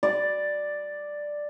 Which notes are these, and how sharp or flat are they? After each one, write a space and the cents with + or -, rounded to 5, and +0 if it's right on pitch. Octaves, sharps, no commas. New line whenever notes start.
D5 +5